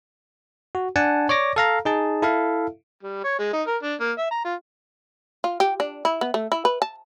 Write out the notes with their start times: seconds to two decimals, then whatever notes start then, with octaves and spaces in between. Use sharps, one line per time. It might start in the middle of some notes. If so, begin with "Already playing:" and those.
0.75 F#4
0.96 D4 F#5 G#5 A5
1.29 C#5 D5 D6 A#6
1.56 A4 F5 A#5
1.85 D#4 G#4 A5
2.22 E4 A4 E5 F5
3.03 G3
3.24 C#5
3.39 G#3
3.53 D#4
3.67 A#4
3.83 D4
4.00 A#3
4.18 E5
4.31 A#5
4.45 F4
5.44 F4
5.60 G4
5.80 D4
6.05 E4
6.21 B3
6.34 A3
6.52 E4
6.65 B4
6.82 A5